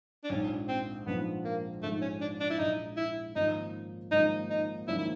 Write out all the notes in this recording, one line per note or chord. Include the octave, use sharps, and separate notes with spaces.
D4
A#1 G#2 F3 C#4
C4
A#1 G#2 F3 B3
A#3
A#1 G#2 F3 A3
C#4
D4
D4
E4
A#1 G#2 F3 D#4
E4
G#1 G#2 F3 A#3 C#4 D#4
G#1 G#2 F3 A#3 C#4 D#4
D#4
G#1 G#2 F3 A#3 C#4 E4
E4